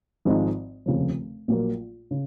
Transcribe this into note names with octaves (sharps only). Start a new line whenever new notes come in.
G#1 G#2 F3 G#3 D#4
F1 D#2 C#3 F3
A#1 A#2 F#3 A#3
C#3